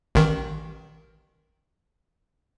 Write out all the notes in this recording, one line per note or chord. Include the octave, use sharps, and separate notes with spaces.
A1 D#3